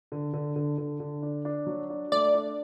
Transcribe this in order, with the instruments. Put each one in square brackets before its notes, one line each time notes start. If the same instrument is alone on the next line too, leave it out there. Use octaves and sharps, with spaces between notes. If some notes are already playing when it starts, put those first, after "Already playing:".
[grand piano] D3
D3
D3
D3
D3
D4
D4
F#3
D4
[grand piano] A3 [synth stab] D5
[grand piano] D4